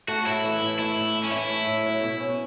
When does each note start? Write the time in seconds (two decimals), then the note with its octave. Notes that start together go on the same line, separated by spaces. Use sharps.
0.08 A3 F#4
0.26 A2 E4
0.44 E3
0.62 A2
0.79 A3 E4
0.96 A2
1.14 E3
1.24 C#4
1.31 A2 E4
1.50 A3
1.67 A2
1.85 F#3
2.02 B2
2.20 C#4